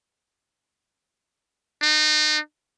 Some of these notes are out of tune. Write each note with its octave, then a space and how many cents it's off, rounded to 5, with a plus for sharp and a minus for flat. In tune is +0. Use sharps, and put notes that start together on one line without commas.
D#4 -35